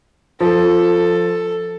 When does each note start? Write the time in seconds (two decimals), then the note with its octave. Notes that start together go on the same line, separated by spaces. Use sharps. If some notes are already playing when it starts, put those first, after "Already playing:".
0.41 F3 A4